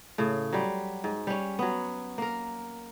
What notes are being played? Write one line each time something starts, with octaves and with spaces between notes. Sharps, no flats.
A2 C#3
F#3 G3
G#2
G3 C#4
F#3 B3
A#3 A#4